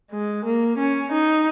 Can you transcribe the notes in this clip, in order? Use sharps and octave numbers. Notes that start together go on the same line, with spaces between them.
G#3
A#3
C#4
D#4